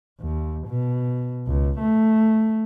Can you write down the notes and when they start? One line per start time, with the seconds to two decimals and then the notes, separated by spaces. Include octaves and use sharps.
0.20 D#2
0.68 B2
1.47 C#2
1.79 A3